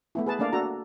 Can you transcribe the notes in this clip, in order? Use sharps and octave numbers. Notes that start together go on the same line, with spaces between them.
A3 B3 E4
G#4 B4 A5
A3 A#3 D4 D5 F5
D4 F#4 A4 A#5